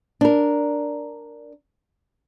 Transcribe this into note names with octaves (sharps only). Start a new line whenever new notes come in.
D4 A#4